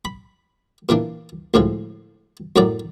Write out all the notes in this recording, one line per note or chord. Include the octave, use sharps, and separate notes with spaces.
B5
A#2 E3 A#3 D4
D2 A2 F3 G#3
F#2 A2 F#3 D5 A#5